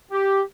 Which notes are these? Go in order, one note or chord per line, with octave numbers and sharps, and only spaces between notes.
G4